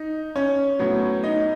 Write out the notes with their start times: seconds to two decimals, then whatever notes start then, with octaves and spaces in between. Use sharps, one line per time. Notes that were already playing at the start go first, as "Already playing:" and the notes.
Already playing: D#4
0.36 C#4 C#5
0.79 A2 F#3 B3
1.23 D#4 D#5